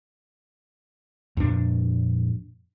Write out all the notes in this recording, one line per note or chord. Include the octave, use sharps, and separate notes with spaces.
F2 A#2 D4